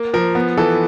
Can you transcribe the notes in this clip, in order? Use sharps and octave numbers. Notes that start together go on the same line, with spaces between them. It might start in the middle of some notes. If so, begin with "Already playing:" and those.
Already playing: A#3
F3 A#4
B3
E3 A4